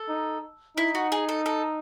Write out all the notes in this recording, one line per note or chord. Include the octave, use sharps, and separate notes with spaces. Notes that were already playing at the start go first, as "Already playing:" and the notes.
Already playing: A4
D#4
D#4 E4
F#4
G#4
A4
A4